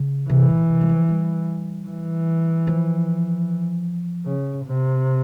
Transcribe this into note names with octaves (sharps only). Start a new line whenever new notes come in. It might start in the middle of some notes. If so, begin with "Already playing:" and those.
Already playing: C#3
C3 E3
A#2
C3
G3
F3
G3
E3
F3
C#3
C3